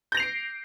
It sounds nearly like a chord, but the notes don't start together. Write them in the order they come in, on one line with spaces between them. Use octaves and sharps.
G6 A#6 F7 C7 D7